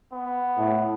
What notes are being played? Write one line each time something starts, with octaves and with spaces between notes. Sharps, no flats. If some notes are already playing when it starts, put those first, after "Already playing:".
B3
A2